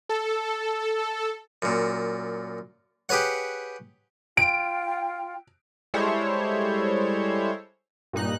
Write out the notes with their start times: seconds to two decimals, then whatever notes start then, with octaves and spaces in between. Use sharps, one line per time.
0.09 A4
1.62 F#2 A#2
3.09 G4 G#4 B4 C#5 F#5
4.37 F4 G5 D7
5.94 G3 G#3 E4 A4 C5 C#5
8.13 G2 A#2 D#4 F#6